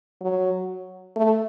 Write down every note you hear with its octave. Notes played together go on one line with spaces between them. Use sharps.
F#3
A3